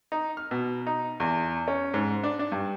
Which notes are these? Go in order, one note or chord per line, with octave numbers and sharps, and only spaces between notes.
D#4
F6
B2
D#4
E2
C#4
G#2
D4
D4
G2